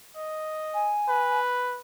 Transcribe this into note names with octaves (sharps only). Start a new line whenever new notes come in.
D#5
G#5
B4